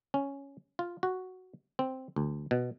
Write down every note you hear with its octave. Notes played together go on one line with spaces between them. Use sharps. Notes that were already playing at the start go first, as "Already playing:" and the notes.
C#4
F4
F#4
C4
D2
B2